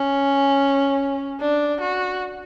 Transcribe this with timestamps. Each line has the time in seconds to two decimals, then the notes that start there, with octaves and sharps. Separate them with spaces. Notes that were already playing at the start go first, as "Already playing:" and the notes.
Already playing: C#4
1.41 D4
1.81 F#4